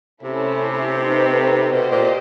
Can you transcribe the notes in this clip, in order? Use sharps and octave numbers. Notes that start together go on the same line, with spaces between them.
C3 A3 C#4 E4
A3 C4 D#4 G4 B4
B2 G4 C5 D#5
A#2